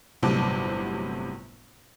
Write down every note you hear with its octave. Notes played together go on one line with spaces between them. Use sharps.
G1 A2 C3 F#3 A5 D6